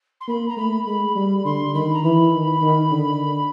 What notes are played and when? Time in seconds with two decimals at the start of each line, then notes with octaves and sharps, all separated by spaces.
0.20 C6
0.28 A#3 B5
0.48 A#5
0.57 A3 B5
0.86 G#3 B5
1.16 G3 B5
1.45 D3 C6
1.74 D#3 B5
1.93 A#5
2.04 E3 B5
2.33 D#3
2.62 D#3
2.91 D3